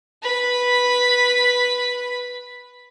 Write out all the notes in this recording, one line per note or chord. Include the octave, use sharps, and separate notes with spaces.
B4 B5